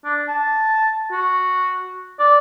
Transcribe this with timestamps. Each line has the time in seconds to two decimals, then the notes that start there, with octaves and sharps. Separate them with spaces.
0.05 D4
0.28 A5
1.11 F#4
2.19 D5